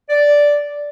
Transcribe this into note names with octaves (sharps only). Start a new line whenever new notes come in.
D5